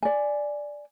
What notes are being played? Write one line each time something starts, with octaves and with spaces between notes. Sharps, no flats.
D5 G#5